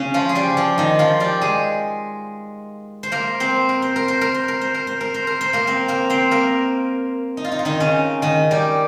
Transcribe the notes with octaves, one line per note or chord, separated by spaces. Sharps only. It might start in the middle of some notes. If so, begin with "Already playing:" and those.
Already playing: C#3 C#4
F3 F4
G#4
G3 G4
F3 F4
D#3 D#4
F3 F4
G3 G4
G#3 G#4
C5
A#3 A#4
C4 C5
A#4
C5
A#4
C5
A#4
C5
A#4
C5
A#4
C5
A#4
C5
A#4
C5
A#3 A#4
C4 C5
A#3 A#4
C4 C5
A#3 A#4
D#4
F4
D#4
F4
D#3 D#4
C#3 C#4
D#3 D#4
G3 G4